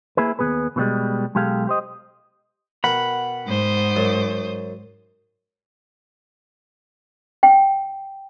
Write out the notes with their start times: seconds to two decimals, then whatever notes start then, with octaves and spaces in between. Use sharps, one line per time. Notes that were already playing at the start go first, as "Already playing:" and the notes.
0.17 A#3 E4 G#4 B4
0.39 D#2 B2 B3 G#4 B4
0.76 B2 E3 G3 G#3
1.35 B1 G#3 G4 A4 F5
1.67 G4 C5 D#5
2.84 B2 A#4 F#5 G5 B5
3.45 G#2 C5 D#6
3.96 F#2 F#3
7.43 G5